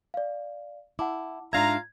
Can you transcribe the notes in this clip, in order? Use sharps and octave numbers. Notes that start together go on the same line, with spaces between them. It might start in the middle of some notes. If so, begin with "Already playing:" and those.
D5 F5
E4 F#5 A5 D6
G#2 D4 F4 E5 F5 A#5 G#6